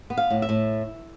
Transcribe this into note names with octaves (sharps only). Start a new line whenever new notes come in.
B3
F5
A2
E5
A2